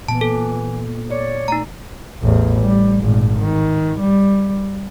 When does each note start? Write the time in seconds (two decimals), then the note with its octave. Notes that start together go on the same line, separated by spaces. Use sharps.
0.08 A#2 E3 B3 A5
0.21 A4
1.11 C#5 D5
1.48 A3 D#4 A#5
2.23 A1 E2
2.61 G3
3.01 G#1 A#2
3.39 D#3
4.00 G3